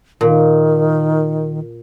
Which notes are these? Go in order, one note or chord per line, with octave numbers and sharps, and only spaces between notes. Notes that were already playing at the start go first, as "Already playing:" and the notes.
A#2 D#3